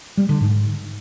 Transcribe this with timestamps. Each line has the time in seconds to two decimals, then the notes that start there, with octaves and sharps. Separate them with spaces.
0.17 G3
0.29 D3
0.40 G#2